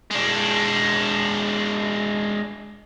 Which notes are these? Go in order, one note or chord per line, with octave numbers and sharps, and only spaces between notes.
G#3 D4